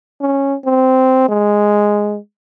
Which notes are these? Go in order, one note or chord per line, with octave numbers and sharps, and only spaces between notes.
C#4
C4
G#3